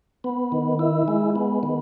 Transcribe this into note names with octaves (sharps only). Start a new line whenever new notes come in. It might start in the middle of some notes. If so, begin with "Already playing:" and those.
B3
D#3
E4
G#3
B3
D#3